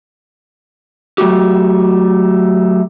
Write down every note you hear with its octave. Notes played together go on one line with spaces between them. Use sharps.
F#3 A3 F#4 G4